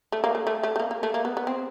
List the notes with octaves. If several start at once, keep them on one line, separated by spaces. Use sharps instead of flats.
A3
A#3
A3
A3
A3
A3
A#3
A#3
A3
A#3
B3
B3
C4